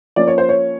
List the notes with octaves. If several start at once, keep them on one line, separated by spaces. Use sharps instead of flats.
F3 A#3 C#4 D5
C#5
C5
C#5